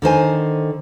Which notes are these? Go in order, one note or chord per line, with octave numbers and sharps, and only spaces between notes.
D3 D#3 C5 G#5